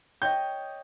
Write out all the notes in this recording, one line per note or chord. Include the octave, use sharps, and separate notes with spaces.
C#5 D#5 G5 G6